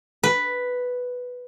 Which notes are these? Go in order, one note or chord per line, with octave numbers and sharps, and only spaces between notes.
B4